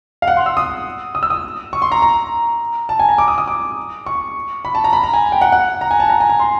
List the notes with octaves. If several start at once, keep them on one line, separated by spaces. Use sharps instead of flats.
F5
F#5
C6
E6
D#6
D#6
E6
D#6
C#6
C6
A#5
A#5
A5
G#5
A#5
D6
D#6
D#6
D6
C#6
B5
A5
A#5
B5
A#5
G#5
G5
F#5
F#5
A#5
G#5
A5
A#5
G#5
A#5
C6